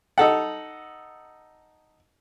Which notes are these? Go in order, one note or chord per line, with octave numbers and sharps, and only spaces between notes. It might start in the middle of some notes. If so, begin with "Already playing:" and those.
D#4 A4 F#5